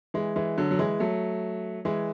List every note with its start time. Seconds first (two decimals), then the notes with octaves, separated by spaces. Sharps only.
0.14 E3 G#3
0.36 E3 G#3
0.58 D3 F#3
0.71 F#3
0.79 E3 G#3
1.00 F#3 A3
1.85 E3 G#3